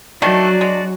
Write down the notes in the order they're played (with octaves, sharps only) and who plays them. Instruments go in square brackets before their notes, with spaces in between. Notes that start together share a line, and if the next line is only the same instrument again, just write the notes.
[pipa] D#3 A3 [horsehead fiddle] F#3 [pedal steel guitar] D4 F#4 [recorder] D5
[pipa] G#3